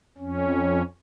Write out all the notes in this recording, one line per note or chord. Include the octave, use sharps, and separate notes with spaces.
F2 C#4